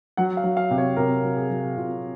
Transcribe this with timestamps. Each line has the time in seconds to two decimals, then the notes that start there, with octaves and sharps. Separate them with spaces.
0.17 F#3 F#5
0.37 F5
0.44 F#3
0.57 F5
0.71 C3
0.78 C#5
0.96 C3 A#4
1.24 F#3
1.36 G#4
1.50 F#3
1.77 C3 F4